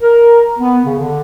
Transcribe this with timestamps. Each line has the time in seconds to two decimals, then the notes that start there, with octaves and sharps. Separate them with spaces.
0.02 A#4
0.59 B3
0.85 C#3
0.98 D3